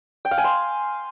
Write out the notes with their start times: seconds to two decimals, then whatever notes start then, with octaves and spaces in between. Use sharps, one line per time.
0.25 G5
0.31 F5
0.38 G#5
0.44 C6